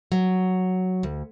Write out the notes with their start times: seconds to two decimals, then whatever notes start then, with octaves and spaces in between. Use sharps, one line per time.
0.12 F#3
1.03 D2